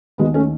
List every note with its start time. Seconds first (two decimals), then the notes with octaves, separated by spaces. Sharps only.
0.18 D#2 D#3 G#3 B3
0.34 A3 C#4